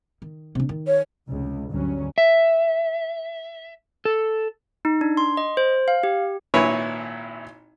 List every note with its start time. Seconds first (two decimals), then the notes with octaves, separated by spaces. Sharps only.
0.22 D#3
0.55 C3 D4
0.69 D#3
0.87 C#5
1.28 F1 C#2
1.70 G1 D2 G2 F#3 C#4
2.18 E5
4.05 A4
4.85 D#4
5.01 D4
5.17 C6
5.37 D#5
5.57 C5
5.88 F5
6.03 G4
6.54 G#1 A#2 E4 B4 C#5 G#5